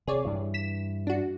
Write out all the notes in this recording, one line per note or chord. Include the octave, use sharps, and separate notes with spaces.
C3 G#4 C#5 D5
G2 E3
B6 E7
D4 F#4